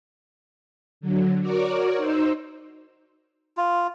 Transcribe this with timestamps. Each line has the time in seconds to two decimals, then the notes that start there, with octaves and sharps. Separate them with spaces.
1.01 D3 F#3
1.41 F#4 A#4 C#5 D5 D6
1.97 D#4 C5 E6
3.57 F4